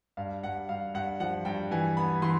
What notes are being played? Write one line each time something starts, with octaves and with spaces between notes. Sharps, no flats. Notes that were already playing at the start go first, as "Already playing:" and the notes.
G2 F5
G2 F#5
G2 F5
G2 F#5
F3 F#5
G2 G5
E3 G#5
B3 B5
E3 C6